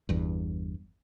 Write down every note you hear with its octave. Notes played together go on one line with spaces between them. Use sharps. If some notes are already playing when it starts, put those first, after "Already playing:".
G1 E2 G2